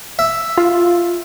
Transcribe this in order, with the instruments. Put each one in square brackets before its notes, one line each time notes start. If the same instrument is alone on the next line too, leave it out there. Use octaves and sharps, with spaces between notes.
[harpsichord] E5
[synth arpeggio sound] F4